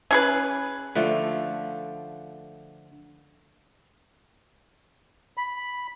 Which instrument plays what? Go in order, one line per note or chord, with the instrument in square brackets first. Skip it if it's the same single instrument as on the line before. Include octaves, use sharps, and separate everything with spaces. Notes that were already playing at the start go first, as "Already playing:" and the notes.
[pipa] C#4 G#4 B4
[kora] D3 F3 A3
[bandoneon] B5